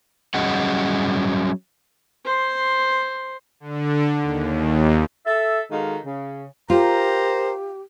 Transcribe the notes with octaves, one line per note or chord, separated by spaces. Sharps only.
F#3 G3 C#4 G#4 D#5 F#5
C5 C6
D3
D#2
A4 E5
D#3 G#3 F#4 A4 F5
C#3
F4 G4 A#4 C5 A#5